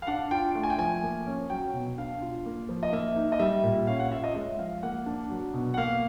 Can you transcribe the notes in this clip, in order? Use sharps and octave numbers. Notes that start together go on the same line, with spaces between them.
F5
D4 F#5
F4 G5
A3
G#5
G5
F3 G#5
A#3
C#4
F#3 G5
B2
D4 F5
F4
A#3
F3
D#5
A#3 E5
D#4
D#5
G3 E5
A#2
C#4 F5
F#5
F4 E5
D#5
G#3 E5
F3 F5
A#3 F#5
D4
F#3
B2
F#5
A#3 F5